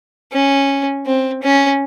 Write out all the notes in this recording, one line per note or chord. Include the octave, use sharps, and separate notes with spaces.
C#4
C4
C#4